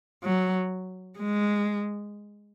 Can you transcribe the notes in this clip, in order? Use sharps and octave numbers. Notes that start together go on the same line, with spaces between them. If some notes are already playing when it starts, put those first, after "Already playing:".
F#3
G#3